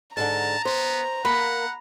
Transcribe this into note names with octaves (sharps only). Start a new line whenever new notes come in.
G#2 D3 A5 A#5
B3 C5
A#3 F#5 B5